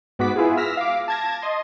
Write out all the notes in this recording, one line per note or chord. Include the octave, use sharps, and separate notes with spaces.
G#2 B3 F#4 D6 B6
B3 E4 F4 G#4
E6 F6 A#6 B6
F5 D6
A5 G#6 A#6
D#5 C6